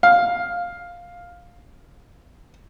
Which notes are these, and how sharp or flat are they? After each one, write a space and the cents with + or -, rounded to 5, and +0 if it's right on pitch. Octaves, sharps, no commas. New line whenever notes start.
F5 +5